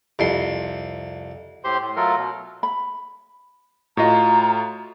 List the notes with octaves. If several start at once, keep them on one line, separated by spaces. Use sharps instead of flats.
C2 F2 C6
A2 G4 C5 C6
A2
F#3 A3 F4 A4 A#4
B2
B5
A2 F4 F#4 D#5 A#5